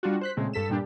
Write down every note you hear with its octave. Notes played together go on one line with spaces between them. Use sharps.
G3 D4 F4 F#4
C5 F#6 B6
A#2 C#3 G#3 A3 C4
G2 A4 B6 E7
G2 A#2 G3 D4 G4